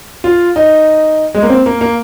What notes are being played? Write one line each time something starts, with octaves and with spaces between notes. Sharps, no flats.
F4
D#4
G#3
A#3
C4
A#3
A#3